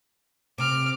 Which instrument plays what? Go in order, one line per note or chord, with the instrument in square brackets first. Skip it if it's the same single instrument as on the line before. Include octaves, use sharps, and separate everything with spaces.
[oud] C3 [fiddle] D6 F6